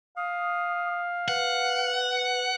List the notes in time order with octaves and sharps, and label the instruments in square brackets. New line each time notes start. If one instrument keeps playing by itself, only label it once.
[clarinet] F5 [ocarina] D#6
[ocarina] B4 [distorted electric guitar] F#5